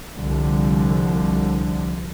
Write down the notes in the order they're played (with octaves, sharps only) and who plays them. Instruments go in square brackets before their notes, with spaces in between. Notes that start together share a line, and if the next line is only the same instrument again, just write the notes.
[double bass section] C2 D3 F3